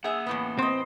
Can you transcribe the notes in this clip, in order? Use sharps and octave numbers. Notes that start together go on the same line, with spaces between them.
A#3 G#4 E5 F#5
E2 A2 B3
C4 C5 D#5